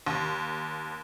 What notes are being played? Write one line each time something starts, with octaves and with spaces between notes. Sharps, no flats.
D#2